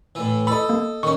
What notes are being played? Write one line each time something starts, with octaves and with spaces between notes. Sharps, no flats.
A2 E3
A4 D#5 B5
A#3
D#3 C#4 C#6